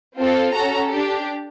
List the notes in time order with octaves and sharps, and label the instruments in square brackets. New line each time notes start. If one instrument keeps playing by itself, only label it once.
[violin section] C4 F4 A4
C#4 F#4 A4 A#5
D4 G4